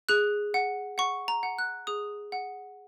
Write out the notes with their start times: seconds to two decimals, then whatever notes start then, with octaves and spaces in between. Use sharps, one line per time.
0.09 G#4 F#6
0.54 F#5
0.98 F#5 C#6
1.28 A#5
1.43 F#5
1.58 F#6
1.87 G#4 D#6
2.32 F#5